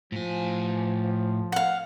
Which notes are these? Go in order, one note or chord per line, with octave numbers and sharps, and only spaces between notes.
A2 F3 G#5
F5 F#5